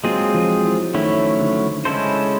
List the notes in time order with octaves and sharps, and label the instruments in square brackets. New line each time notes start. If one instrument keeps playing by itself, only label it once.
[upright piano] F#3 [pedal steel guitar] G#3 C4 F4 G#4
[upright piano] F3
E3
[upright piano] D#3 [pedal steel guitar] F#3 A3 C#4 E4
[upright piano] D3
[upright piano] C#3 [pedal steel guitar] G#3 C#4 E4 A4 C5